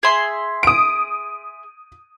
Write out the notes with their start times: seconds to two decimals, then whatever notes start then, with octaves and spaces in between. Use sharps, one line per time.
0.03 G#4 E5 C6
0.63 D#6 D7